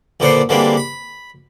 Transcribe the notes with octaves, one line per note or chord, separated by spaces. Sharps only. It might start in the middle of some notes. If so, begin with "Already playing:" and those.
A#1 A#2 D3 B3 C5 D5
D3 E3 G3 G#3 A#3 C4
B5